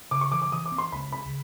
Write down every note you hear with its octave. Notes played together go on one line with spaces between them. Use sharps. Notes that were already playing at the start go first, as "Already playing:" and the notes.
C#3 D6
C#6
E3 D6
D6
E3 D#6
D6
C4
C6
C#2 B5
C#3 B5